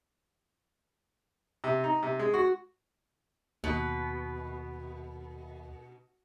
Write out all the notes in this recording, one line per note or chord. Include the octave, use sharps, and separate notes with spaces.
C3
D#4
C3
G#3
F#4
D#2 B2 B4